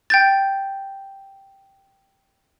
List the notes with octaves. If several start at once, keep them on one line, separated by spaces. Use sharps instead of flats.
G5 G6 A6